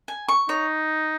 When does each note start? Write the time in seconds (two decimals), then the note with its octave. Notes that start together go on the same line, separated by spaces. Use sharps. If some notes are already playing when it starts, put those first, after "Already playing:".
0.08 G#5
0.28 C#6
0.49 D#4 C#5